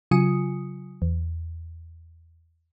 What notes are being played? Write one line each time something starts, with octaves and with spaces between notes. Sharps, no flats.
C#3 F#3 F4 G#5 D#6 C#7
E2